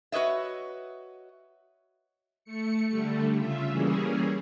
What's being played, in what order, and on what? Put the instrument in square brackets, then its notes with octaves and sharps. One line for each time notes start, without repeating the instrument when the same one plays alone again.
[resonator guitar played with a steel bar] F#4 B4 C#5 D#5 E5
[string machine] A3 C#7
D3 G3 A3
C#3 F4 E5
E3 G3 A#3 C#4 G#4